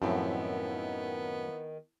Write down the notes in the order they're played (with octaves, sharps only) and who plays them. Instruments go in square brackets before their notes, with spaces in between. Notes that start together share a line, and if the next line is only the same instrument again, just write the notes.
[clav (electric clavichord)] F#2 A2 [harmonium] D#3 [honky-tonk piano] F3 C4 E4 [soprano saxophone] B3